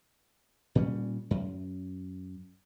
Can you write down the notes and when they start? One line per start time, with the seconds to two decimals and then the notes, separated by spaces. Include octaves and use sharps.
0.75 A#2 G3 C#4
1.31 F#2